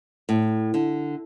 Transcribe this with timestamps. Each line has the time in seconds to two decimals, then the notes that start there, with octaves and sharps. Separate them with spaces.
0.29 A2
0.74 D3